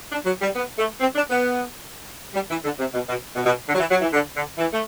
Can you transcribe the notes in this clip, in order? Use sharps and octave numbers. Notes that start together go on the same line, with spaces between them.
D4
F#3
G3
B3
A3
C4
D4
B3
G3
E3
D3
C3
B2
B2
B2
B2
D3
F#3
E3
F#3
E3
D3
D3
E3
A3